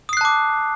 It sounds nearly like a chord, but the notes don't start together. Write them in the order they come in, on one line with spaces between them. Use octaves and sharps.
D#6 C7 F#6 A5 D6